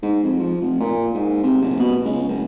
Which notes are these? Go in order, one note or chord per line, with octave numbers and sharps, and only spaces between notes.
G#2
F2
F3
F1
A#2
G#2
C3
F#1
B2
C#2
F#1